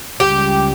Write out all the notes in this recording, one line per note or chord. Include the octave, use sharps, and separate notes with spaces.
C#2 C#3 G3 G4